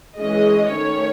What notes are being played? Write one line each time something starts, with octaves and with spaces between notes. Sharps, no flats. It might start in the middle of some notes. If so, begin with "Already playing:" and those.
E3 G#3 C#4 D#5
D#3 A3 C#4 C#5